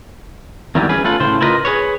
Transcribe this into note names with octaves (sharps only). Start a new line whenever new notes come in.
E2 D#3 E3 F#3 G3 C#4
C#4 G#4 B4
A3 F4 A4 B4
A2 C#3 C5
E4 F4 A#4 B4 D#5
G#4 B4 C#5